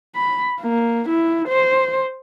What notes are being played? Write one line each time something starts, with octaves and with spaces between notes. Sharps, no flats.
B5
A#3
E4
C5